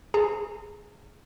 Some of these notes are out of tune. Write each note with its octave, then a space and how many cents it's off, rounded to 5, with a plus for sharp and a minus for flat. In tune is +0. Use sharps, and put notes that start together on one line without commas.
G#4 +0 A#5 -40